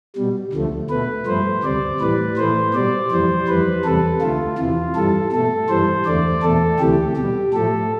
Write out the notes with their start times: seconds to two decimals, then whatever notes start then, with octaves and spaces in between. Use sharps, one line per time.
0.16 B2 G3
0.53 D2 D3 F3 A3
0.90 B2 A3 B4
1.26 G2 F3 A3 C5
1.63 D2 C3 G3 D5
2.00 A2 E3 G3 B4
2.37 A2 E3 A3 C5
2.74 B2 G3 D5
3.10 F2 E3 G3 C5
3.48 F2 E3 G3 B4
3.84 E2 C3 G3 A4
4.21 D2 D3 A3 F4
4.58 E2 C3 E3 F4
4.95 G2 E3 G3 A4
5.32 B2 A3 A4
5.69 G2 E3 G3 C5
6.06 E2 D3 A3 D5
6.43 E2 B2 A3 A4
6.79 D2 C3 E3 A3 G4
7.16 B2 G3 G4
7.53 A2 F3 A3 A4